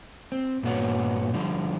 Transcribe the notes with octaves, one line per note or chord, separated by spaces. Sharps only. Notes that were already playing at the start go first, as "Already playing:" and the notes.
C4
G2 A#2 B3 F#4 C#5
D3 F3 G3